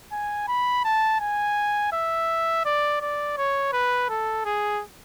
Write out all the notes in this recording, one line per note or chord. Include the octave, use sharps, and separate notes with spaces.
G#5
B5
A5
G#5
E5
D5
D5
C#5
B4
A4
G#4